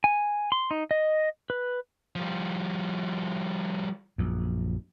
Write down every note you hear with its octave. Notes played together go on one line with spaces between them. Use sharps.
G#5
C6
D#4
D#5
B4
F3 G3
A#1 F#2